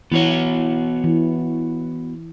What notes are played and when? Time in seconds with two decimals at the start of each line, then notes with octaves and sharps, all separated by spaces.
0.12 E3 B3 F#4 C#5
1.04 E3